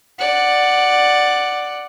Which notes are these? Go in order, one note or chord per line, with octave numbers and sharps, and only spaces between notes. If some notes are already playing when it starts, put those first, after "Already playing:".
D5 F#5